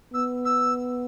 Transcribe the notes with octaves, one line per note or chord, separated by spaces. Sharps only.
B3 E6
E6